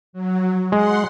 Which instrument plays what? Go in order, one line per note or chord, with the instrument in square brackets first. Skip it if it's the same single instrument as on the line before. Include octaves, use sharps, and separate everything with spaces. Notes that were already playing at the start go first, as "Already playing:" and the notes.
[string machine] F#3
[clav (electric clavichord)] G#3 [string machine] F#5 C6